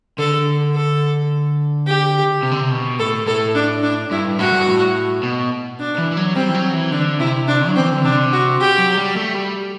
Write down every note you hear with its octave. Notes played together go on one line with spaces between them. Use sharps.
D3 A4
A4
G4
C3
D3
C3
B2
A2 A4
A2 A4
D4
D4
G2 E4
A2 F#4
G2
A2
B2
D4
E3
E3
F#3
G3 C4
E3
F#3
E3
D3 D4
C3 E4
D4
F#3
C4
E3
D3
C3 D4
F#4
G4
F#3
G3
A3
G3